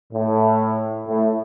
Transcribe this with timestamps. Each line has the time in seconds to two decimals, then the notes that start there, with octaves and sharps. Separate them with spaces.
0.13 A2
1.07 A2